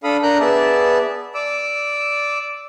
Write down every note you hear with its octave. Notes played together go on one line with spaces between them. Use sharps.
D4 A4 F5 B5 D#6
D4 A#4 A#5 F#6 G6
B3 G#4 D5 E5 A5
D5 D6 E6